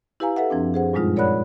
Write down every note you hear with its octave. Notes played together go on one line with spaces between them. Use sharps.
E4 G4 B4 F5 G#5 A#5
A4 B4 E5 F#5
F#2 F3 C4 D4
G#4 C5 F#5
G2 A#2 G3 G#3 D#4 F4
A#4 C#5 D5 F#5 B5 F#6